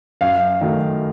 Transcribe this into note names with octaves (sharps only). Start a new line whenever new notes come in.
F#2 F5
D#3 F#3 A3